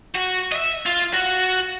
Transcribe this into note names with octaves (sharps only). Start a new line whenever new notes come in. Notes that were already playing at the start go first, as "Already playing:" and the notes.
F#4
D#5 E5
F4
F#4